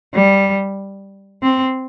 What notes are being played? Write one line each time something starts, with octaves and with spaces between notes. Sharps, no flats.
G3
C4